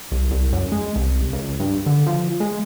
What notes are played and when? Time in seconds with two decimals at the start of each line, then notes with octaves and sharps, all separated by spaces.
0.12 C2
0.31 C2
0.53 F#2
0.72 G#3
0.96 C2
1.33 C#2
1.59 G2
1.86 D3
2.06 F3
2.40 G#3